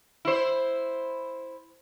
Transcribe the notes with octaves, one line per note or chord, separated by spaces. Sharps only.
E4 C5